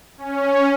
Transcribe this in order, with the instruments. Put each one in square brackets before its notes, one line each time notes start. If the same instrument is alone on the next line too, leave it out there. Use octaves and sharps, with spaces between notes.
[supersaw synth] C#4